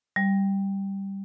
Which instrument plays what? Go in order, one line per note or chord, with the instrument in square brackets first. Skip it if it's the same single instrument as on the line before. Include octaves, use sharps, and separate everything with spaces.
[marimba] G3